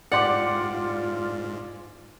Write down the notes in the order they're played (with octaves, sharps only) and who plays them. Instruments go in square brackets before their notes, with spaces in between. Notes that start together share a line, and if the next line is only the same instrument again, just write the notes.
[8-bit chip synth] G#2 [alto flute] F4 [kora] G4 F#5 [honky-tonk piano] D5 C6 D6